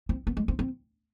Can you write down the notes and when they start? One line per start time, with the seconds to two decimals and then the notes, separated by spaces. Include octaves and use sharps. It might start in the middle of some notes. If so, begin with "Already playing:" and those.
0.09 C4
0.27 B3
0.37 G#3
0.48 C4
0.59 C4